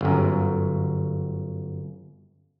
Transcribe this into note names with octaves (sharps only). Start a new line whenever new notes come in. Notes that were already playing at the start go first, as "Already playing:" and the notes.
G1 F#2